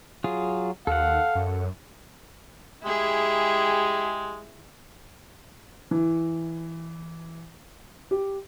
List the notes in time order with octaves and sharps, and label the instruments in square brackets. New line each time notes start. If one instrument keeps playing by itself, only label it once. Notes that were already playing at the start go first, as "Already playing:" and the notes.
[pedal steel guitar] F#3 F4 G#4
[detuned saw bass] D#2 [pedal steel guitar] A4 F#5 [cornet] F5
[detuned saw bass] F#2
[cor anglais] G#3 [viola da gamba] E4 G#4 [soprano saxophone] G4
[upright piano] E3
G4